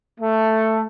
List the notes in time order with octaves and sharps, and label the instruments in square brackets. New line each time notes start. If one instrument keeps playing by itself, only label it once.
[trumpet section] A3